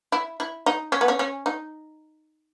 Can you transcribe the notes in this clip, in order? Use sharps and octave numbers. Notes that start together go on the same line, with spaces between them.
E4
E4
D#4
C#4
B3
C#4
C#4
D#4